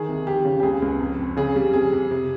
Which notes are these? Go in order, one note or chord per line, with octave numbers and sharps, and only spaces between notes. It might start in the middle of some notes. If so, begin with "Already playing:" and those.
Already playing: D#3 G#4
C2
F2 G4
C#3
G4
C#2 G#4
C#2
F2
F2
C#3 G#4
G3
F2 G#4
F2
C3